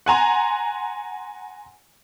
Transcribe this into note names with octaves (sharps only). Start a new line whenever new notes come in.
F#5 G#5 A#5 C6